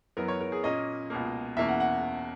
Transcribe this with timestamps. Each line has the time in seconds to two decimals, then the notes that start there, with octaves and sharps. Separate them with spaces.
0.17 F#2 E3 B3 A#4
0.28 C#5
0.41 A#4
0.52 G#4
0.63 A#2 A#3 C#4 D#5
1.10 C#2 B2 A#3
1.57 E2 B2 A#3 C#4 E5
1.69 F#5
1.80 F#5